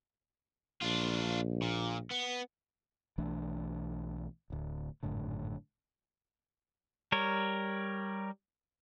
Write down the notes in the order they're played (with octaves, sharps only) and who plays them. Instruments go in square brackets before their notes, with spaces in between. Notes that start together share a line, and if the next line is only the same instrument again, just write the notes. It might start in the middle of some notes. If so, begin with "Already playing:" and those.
[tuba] A#1 [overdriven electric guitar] D4 F4
[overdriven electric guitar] A#2
B3
[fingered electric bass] B1 E3 A3 D4
D1 D2
G#1 F#2 A2 D3
[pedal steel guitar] G3 A#4 C#5